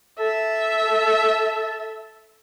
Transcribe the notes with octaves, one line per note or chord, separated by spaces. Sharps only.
A4 E5